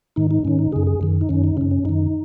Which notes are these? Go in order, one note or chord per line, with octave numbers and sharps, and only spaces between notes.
G#2 D#3 D#4
D#4
G#2 D#3 C#4
D#4
F#2 C#3 G#4
G#4
F#2 D#3
D#4
F#2 D#3 C#4
D#4
F#2 C#3 C#4
C#4
F#2 D#3 D#4